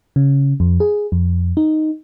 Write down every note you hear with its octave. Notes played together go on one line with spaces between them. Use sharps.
C#3
F2
G#4
F2
D#4